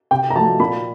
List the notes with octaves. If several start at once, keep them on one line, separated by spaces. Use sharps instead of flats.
C3 G5
A#5
F3 A3 A5
A#2 B5